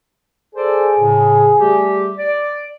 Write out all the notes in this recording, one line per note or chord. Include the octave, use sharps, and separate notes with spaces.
G#4 A4 C5 D5
A2 C#3
G3 A3 G4
D5